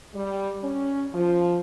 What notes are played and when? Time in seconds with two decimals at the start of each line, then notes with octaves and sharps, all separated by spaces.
0.14 G3
0.63 C#4
1.13 F3